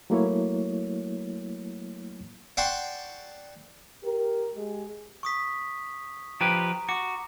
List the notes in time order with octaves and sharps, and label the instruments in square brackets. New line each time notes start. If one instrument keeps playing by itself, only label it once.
[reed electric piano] F#3 A3 A#3 E4 C#5
[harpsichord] D5 F#5 G5 A5 C6 C#6
[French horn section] G4 A#4
G#3 G4 G#4
[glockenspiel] C#6 D#6 B6
[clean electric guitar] F3 G4 B4 [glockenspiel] A#5
[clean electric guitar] F#4 [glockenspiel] D6